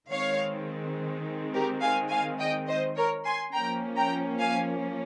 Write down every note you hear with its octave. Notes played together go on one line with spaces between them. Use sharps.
D#3 G#3 C4 C#5 F5
G4 A#4
F5 G#5
F5 G#5
D#5 G5
C5 D#5
A#4 C#5
G#5 C6
F3 A#3 C#4 G5 A#5
G5 A#5
F5 G#5